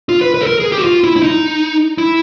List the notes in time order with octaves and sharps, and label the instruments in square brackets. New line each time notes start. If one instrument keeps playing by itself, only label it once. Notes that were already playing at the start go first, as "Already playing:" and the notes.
[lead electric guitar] F4
B4
B4
A4
A#4
G#4
G4
F#4
F4
E4
E4
D#4
E4